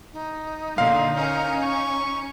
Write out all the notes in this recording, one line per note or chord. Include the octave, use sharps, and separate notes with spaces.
D#4
A#2 D3 F5 C6
C#4 A#4
C#6